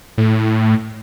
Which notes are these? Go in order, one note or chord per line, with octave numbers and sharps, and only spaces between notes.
A2